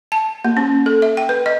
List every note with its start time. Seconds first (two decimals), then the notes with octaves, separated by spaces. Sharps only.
0.12 A5
0.45 A#3
0.57 C#4
0.86 A4
1.02 E5
1.17 G5
1.29 B4
1.46 D#5